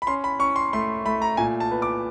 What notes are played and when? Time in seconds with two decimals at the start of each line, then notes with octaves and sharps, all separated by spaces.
0.02 B5
0.07 C#4 C6
0.24 B5
0.39 C#4 C#6
0.56 C6
0.73 A3 C6
1.05 A3 B5
1.22 A#5
1.37 A#2 G#5
1.60 A5
1.71 B3
1.82 D6